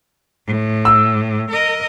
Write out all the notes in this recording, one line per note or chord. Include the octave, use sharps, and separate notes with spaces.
A2
E6
A#4 D#5